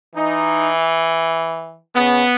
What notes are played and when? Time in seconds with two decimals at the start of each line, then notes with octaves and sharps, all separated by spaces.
0.15 E3 D#4
1.96 C#3 B3